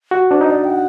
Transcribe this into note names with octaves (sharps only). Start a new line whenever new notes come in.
F#4
D4 C5
D#4 D#5
D5
G5
F#5